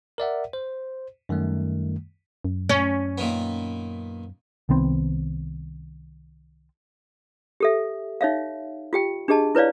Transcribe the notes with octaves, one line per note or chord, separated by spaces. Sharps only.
A#4 D5 E5 F#5
C5
F#2 D#3 G3 A3
F#2
C#4
A#2 D#3 B3
C2 D#3 B3 C4
G4 A4 E5
D#4 C#5 E5 F5
F4 G4 G5
D4 G4 G#4 D#5 A5
E4 B4 C#5 D5 F5